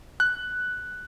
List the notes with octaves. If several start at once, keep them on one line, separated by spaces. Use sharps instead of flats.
F#6